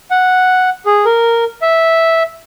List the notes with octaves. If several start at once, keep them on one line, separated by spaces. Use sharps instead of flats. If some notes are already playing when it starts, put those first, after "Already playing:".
F#5
G#4
A#4
E5